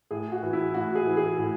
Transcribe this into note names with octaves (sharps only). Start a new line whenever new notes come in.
A2 G#4
F#4
E3
E4
A2 F#4
G#4
E3
G#4
A2